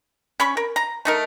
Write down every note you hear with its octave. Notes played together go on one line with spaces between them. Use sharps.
C#4 B5 C#6
A#4
A#5
A3 D#4 A#4